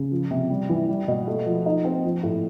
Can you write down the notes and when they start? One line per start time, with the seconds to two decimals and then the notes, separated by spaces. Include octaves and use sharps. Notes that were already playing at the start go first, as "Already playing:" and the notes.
Already playing: C#3
0.11 F3
0.31 C3
0.50 G3
0.69 E3
0.89 G3
1.08 B2
1.28 A3
1.46 F3
1.66 D#4
1.85 C4
2.04 F3
2.23 A2